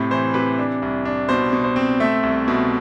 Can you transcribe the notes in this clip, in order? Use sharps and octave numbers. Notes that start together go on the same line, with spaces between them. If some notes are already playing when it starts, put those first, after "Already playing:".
Already playing: A2 C3
E3 C5
C3 B4
D4
C2
D4
B2 C5
B2
C5
C4
A3 E5
C2
B2